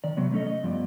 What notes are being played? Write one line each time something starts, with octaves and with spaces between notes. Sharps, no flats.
D#3 D5
C3 F#3 B3
A3 C#4 A4 D#5
D#5
G2 F3 B3 D5